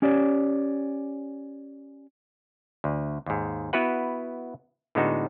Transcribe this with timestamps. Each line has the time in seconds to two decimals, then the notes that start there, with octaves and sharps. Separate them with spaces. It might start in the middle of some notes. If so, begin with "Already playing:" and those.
0.02 C#4 G4 C#5 D5
2.84 D2
3.26 D#2 G#2
3.73 B3 E4 F#4 B4 F#5
4.95 A2 D3 G#3 B3 D#4 F#4